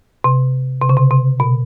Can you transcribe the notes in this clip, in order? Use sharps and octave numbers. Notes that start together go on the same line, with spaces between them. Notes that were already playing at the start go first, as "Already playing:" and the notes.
C3
C3
C#3
C3
C3
B2